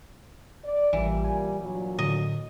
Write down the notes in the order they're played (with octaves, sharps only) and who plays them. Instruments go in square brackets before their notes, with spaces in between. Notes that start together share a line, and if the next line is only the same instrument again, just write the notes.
[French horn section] D5
[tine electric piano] A1 [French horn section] A#2 G3 [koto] E3
[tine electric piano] G#5
[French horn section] G2 A#2 F#3
[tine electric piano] A2 D3 [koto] D#5